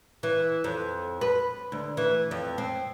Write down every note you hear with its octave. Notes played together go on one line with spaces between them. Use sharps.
E3
F2
B4
D2
E3
F2
C4